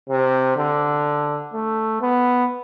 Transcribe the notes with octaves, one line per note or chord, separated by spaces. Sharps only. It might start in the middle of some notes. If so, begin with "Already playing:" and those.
C3
D3
A3
B3